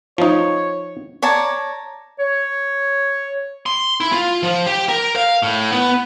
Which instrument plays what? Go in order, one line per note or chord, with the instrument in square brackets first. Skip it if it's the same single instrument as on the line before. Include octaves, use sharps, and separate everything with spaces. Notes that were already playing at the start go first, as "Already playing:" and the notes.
[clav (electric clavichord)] F3 D#4 [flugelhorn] C#5
[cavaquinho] C#5 D5 A5 A#5
[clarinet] C#5
[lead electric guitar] C6
E4
F4
F3
G4
A#4
F5
A2
B3